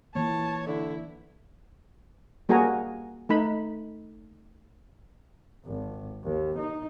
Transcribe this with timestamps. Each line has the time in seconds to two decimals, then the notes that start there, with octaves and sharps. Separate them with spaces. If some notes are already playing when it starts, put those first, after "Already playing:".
0.15 E3 A#3 C#5 A5
0.66 D3 E4
2.49 G3 A#3 F#4 G#4 G#5 A#5
3.29 A3 D#4 B5
5.66 G#1
6.24 D#2
6.58 D#4